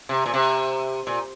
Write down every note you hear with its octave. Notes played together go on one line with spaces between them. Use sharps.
C3
A#2
C3
A#2